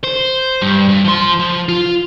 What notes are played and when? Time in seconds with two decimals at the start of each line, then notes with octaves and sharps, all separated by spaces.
0.04 C5
0.62 G2
0.89 G2
1.05 F3 C6
1.40 F3
1.69 F4